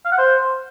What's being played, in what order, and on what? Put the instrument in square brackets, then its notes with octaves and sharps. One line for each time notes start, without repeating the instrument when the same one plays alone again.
[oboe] F5
F#5
C5